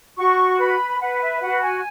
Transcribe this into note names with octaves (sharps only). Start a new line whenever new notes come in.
F#4 C#6
B4 B5
B4 F#5
E5
F#4 F#5
G#5